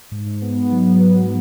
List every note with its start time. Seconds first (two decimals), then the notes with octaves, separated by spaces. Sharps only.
0.11 G#2
0.26 G#2
0.42 B3
0.57 G#2
0.72 F#3
0.88 B3
1.03 B3